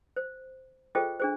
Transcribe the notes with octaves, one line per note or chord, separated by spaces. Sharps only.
C5
F4 G#4 A4 C5 D#5 G5
D4 G#4 C5